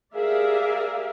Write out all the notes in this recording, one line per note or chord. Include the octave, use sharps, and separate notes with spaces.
G4 G#4 A#4 D5 E5 F5